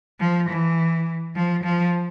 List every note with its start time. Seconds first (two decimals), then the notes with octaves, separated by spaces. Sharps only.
0.20 F3
0.49 E3
1.35 F3
1.64 F3